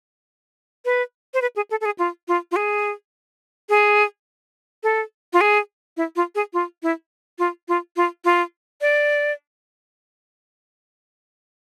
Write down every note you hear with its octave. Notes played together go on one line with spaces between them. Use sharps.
B4
C5
B4
G#4
A4
A4
G#4
F4
F4
F4
G#4
G#4
A4
F4
G#4
E4
F4
G#4
F4
E4
F4
F4
F4
F4
D5